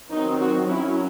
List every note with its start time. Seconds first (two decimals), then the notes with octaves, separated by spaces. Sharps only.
0.10 D#3 F#3 C4 D#4
0.39 F#4
0.68 F#3 C#4 E4